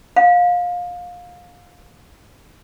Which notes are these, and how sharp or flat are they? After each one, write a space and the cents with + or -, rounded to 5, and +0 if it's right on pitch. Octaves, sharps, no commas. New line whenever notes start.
F5 +25